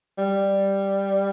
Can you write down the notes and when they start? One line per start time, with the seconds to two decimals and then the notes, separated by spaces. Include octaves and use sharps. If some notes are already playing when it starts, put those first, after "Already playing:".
0.18 G3